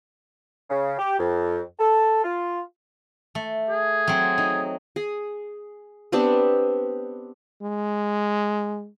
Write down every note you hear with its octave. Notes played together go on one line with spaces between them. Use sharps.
C#3
G4
F2
A4
F4
A3
G#4
F#3 C4
D#4
G#4
B3 C4 D4 G4
G#3